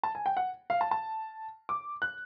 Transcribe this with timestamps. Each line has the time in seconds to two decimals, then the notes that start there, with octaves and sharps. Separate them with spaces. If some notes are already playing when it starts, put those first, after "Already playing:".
0.03 A5
0.15 G#5
0.26 G5
0.37 F#5
0.70 F5
0.81 A5
0.91 A5
1.69 D6
2.02 F#6